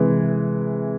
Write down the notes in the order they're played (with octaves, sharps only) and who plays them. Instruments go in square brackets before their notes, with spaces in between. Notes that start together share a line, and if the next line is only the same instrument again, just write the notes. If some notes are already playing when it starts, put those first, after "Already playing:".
Already playing: [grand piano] C3 E3 G#3